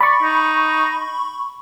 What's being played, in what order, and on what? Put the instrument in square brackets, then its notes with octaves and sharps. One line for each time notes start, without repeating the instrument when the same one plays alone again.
[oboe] D5 [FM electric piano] B5 C#6
[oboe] D#4